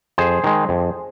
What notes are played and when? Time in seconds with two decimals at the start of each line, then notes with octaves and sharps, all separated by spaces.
0.18 F2 G#4 C5
0.44 D#3 G#3
0.69 F2